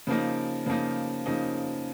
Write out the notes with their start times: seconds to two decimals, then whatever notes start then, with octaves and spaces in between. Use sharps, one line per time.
0.07 C#3 F3 A#3 D#4
0.66 C#3 F3 A#3 D#4
1.26 C#3 F3 A#3 D#4